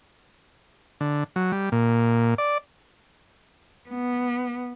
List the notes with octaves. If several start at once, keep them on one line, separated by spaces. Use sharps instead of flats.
D3
F#3
G3
A#2
D5
B3